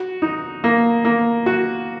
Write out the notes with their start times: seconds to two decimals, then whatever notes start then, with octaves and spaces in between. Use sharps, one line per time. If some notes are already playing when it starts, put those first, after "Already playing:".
Already playing: F#4
0.22 D#4
0.64 A#3
1.05 A#3
1.46 F#4